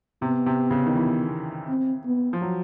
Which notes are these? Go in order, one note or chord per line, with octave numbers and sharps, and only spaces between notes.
C3 B3
C3
C#3
D#3
E3
C4
B3
F3
F#3